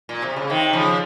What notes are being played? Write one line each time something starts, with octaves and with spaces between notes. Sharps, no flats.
A#2
C3
C#3
C3 D#3
C#3 F3